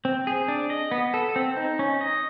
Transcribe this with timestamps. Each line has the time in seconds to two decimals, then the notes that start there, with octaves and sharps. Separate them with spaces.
0.05 C4
0.27 G#4
0.48 D4
0.70 D#5
0.91 B3
1.14 A4
1.36 C4
1.57 D#4
1.79 C#4
2.01 D#5